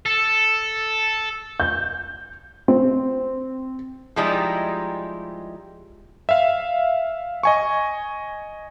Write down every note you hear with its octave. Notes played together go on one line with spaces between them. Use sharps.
A4
G6
C4
F3 G3 G#3 D#4 E4 G4
E5 F5
D#5 G#5 C#6